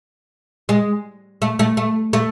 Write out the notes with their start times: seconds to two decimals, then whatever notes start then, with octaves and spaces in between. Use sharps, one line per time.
0.69 G#3
1.42 A3
1.59 A3
1.77 A3
2.13 A3